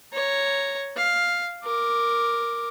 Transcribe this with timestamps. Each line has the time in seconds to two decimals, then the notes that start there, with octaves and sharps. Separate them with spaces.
0.13 C#5 A#5
0.96 F5
1.63 A#4 D6